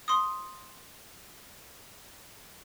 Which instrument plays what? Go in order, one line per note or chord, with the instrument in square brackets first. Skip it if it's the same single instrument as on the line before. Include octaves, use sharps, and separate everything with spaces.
[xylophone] C6 D#6